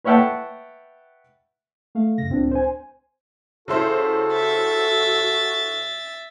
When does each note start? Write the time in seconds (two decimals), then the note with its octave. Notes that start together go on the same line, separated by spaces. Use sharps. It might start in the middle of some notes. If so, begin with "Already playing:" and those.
0.04 B4 C#5 E5 F#5 G5 A5
1.95 A3 F5
2.18 F#2 C#3 A#6
2.30 C#2 A2 C4 D4
2.51 C5 G#5
3.68 C#3 E4 F#4 A4 C5
4.34 E5 A6